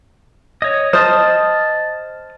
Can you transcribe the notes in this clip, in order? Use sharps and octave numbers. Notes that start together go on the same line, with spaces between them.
C#5 D#5
C5 D#5 A5 D#6 F6